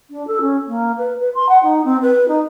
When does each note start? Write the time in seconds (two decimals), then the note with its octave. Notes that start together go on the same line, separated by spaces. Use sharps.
0.10 D4
0.27 A4
0.41 C#4
0.67 A#3
0.97 B4
1.20 B4
1.35 C6
1.48 F#5
1.63 D#4
1.84 C4
2.02 B4
2.28 D#4